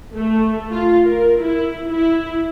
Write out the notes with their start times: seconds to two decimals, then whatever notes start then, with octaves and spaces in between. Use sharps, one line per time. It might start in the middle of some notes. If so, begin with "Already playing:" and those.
0.14 A3
0.72 F4
1.05 A#4
1.42 E4
1.92 E4